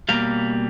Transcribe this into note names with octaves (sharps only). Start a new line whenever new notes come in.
B2 G3 A#3 F5